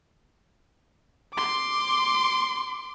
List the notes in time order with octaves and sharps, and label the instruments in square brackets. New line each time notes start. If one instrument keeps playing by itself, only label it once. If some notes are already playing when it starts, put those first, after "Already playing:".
[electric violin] C6 D6